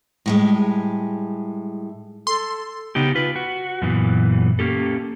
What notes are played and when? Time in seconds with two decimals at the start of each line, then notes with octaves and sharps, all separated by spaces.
0.26 A2 G3 G#3
2.27 A4 C6
2.95 C#3 B3 D#4 G4
3.15 F4 B4
3.36 F#4
3.82 F#2 A#2 E3 B3
4.59 A#3 C#4 G4 A4